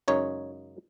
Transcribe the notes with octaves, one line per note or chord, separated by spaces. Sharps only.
F#2 C#3 G#3 D#4 C#5